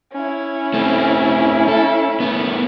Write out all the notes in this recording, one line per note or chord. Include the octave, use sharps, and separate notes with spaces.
C#4 E4
A3 C4
A4
A3 B3